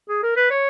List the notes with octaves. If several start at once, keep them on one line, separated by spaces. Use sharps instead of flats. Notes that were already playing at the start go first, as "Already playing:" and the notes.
G#4
A#4
B4
C#5